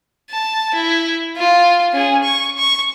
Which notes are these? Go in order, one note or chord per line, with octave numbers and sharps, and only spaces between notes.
A5
E4
F4
C#4 G#4
C#6
C#6